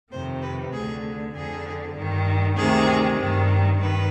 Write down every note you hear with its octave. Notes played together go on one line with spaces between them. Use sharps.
F2 C3 D#3 C5
B4
D2 D3 G#4
F2 D3 G#4
G2 D#3
D2 C3 D#3 G#4
G2 D#3
G2 D#3 B4